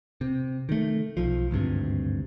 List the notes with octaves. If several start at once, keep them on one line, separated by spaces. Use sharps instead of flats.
C3
D#3 A3
B1 F3
G#1 D2 G2 C3